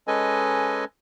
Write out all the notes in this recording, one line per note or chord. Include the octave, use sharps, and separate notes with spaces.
G#3 C#4 A4 B4 D#5 G#5